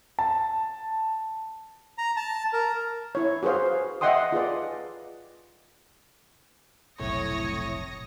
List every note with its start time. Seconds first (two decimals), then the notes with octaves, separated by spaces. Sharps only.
0.19 A5
1.98 A#5
2.17 A5
2.53 A#4
3.15 E4 C#5
3.43 F#4 G#4 B4 C5 F5
4.01 D#5 E5 F#5 G5 C6 D#6
4.32 F4 G#4 B4 D5
7.00 F1 B1 F2 A2 C#5 D#6 A#6 C#7